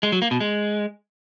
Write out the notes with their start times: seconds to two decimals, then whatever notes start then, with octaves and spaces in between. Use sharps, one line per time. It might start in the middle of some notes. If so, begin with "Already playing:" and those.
0.03 G#3
0.12 F#3
0.22 A#3
0.31 B2
0.40 G#3